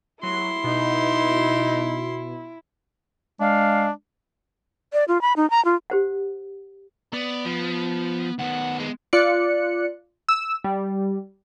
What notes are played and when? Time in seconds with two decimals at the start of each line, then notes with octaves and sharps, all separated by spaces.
0.23 F#3 E4 C6
0.64 B2 D#4
3.40 G#3 D4 F5
4.93 D5
5.08 F4
5.22 B5
5.37 D#4
5.50 A#5
5.65 F4
5.90 G4 C5 F#5
7.13 B3 D5
7.45 F3
8.39 D#3 B3 F#5
8.80 G#3
9.13 F4 D5 F#6 C#7
10.29 E6
10.64 G3